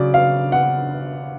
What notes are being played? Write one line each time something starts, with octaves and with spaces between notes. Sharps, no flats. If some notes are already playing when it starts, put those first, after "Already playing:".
Already playing: C#3 F#3 D5
F5
F#5